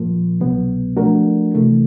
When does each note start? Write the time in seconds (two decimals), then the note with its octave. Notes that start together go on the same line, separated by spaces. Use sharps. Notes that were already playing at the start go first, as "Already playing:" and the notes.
Already playing: A#2 F3 A#3
0.40 C2 B2 F#3 B3
0.97 F3 A3 D4 F#4 A#4
1.54 C3 E3 A3